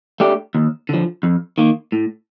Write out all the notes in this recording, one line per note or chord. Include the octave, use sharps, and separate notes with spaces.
A3 D4 G4
D#2
D3 F3
F2
D#3 A#3
A2